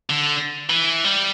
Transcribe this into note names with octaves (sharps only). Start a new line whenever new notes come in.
D3
E3
G3